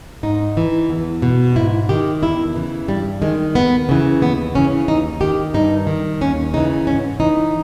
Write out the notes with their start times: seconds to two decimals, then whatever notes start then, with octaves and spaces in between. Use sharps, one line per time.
0.23 G#2 D#4
0.57 E3
0.89 E2
1.22 B2
1.56 G#2 E4
1.89 D#3 G4
2.22 E2 E4
2.55 C#3 E3
2.88 G2 G3
3.22 D#3 G#3
3.55 D#2 B3
3.89 C#3 E3
4.22 D#2 B3
4.55 C#3 E3 C#4
4.88 D#2 D#4
5.21 D#3 G4
5.54 G2 D#4
5.87 D#3
6.21 D#2 C#4
6.53 C#3 E3 D#4
6.87 G#2 C#4
7.20 E3 D#4